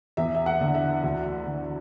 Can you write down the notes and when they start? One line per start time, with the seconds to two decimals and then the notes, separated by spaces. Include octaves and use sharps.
0.17 E2 E5
0.35 E5
0.46 F#5
0.61 D3
0.75 E5
1.03 D2
1.46 D3